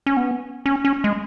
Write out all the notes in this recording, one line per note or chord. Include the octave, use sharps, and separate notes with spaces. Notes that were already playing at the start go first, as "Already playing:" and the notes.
C#4
B3
C#4
C#4
G#3